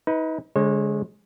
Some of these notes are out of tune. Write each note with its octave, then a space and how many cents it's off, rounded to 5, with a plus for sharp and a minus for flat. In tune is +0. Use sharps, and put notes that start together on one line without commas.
D#4 +35 B4 +0
D3 -30 G#3 +0 C#5 -40